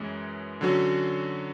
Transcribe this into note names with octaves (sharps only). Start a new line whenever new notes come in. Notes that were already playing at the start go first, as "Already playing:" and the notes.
Already playing: F#2 E3 G#3 C#4
D3 F#3 C#4 F#4